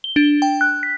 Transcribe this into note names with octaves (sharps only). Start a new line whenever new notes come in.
G7
D4
G5
F#6
B6